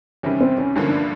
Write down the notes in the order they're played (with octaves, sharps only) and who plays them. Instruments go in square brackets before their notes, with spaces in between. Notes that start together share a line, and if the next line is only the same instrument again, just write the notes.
[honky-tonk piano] E2 C3 D#3 G3 [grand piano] C#4
[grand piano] C4
C#4
[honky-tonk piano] G#1 G2 D3 F3 A#3 [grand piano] C#4
[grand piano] D4